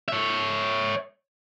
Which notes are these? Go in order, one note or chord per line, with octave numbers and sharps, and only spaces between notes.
C#5 E5